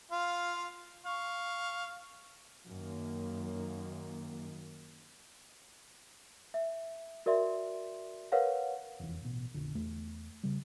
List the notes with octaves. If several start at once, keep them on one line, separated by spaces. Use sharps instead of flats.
F4 F5
F5 C#6
F#2 D#3 A#3
E5
F#4 A#4 D5 E5 C6
A#4 B4 C#5 F5 F#5
F1 E2
A1 B2
F1 A#1 D3
E2 A3
C#3 G3